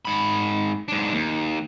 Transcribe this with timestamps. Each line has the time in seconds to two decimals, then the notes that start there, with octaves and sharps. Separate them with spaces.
0.05 G#2 B5
0.88 G#2 D4
1.14 D#2